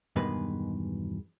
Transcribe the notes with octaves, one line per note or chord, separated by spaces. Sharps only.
E2 G2 B2 D#3 G#3 B4